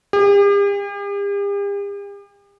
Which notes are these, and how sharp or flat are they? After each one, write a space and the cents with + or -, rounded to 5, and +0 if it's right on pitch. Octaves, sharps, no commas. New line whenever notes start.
G4 +45